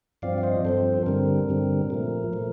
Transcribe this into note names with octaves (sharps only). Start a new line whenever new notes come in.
G2 F3 C4 D5 F5
F5
C5 D#5
G2 F3 C4 A4 C5
G2 D3 G3 C4 A#4
G2 D3 G3 C4
A#2 F3 A3 A#4
A#2 F3 A3